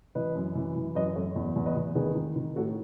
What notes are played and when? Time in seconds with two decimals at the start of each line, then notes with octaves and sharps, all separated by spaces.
0.15 E3 B4 D#5
0.35 F#2
0.55 E3
0.76 E3
0.95 F#2 B4 D#5
1.16 F#2 A4 C#5
1.35 E2
1.56 E2
1.66 B4 D#5
1.76 E2
1.95 D#3 G#4 B4
2.15 D#3
2.36 D#3
2.56 A2 F#4 A4